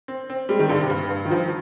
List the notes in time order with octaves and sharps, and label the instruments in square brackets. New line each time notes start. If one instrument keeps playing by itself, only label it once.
[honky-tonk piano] C4
C4
[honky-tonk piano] G3 [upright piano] G#3
[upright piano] D#3
[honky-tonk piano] G2 [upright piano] D3
[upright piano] C3
[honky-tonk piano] G2
G2
[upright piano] D#3
[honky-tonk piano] G2 [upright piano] F3